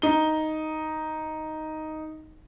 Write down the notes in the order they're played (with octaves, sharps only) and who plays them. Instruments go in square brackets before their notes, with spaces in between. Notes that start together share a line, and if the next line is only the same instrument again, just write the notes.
[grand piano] D#4 G7